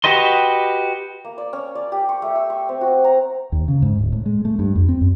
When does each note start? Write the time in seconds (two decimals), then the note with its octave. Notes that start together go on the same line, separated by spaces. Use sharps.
0.04 F#4 G4 B4 D#5 C6
1.25 A#3
1.38 D5
1.53 C#4
1.75 D5
1.92 G4
2.09 C#6
2.22 A3
2.35 E6
2.50 C#6
2.69 C4
2.81 F#4
3.04 A#5
3.52 D#2
3.68 C#3
3.82 G#2
3.99 D1
4.12 A2
4.26 G#3
4.45 A3
4.59 G2
4.76 F2
4.89 C4
5.01 F#2